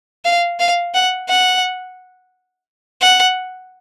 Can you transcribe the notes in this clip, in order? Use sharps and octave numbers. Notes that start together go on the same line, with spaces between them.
F5
F5
F#5
F#5
F#5